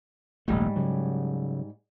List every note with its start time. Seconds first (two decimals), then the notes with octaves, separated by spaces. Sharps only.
0.48 D#1 A#1 G#2 G3 A3
0.76 C#3 F#3